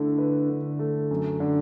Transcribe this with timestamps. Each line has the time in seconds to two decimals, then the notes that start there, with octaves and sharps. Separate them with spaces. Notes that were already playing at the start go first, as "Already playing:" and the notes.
Already playing: D3 A3 E4
0.18 B4
0.49 D3
0.79 A3
1.11 F#2
1.40 D3